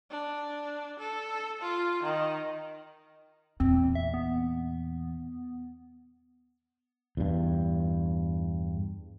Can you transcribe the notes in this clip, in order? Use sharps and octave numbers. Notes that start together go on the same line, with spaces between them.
D4
A4
F4
D#3
E2 A#2 C4
E5
B3
E2 G2